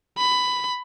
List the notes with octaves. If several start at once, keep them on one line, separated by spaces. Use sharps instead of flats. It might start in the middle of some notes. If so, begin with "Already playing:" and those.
B5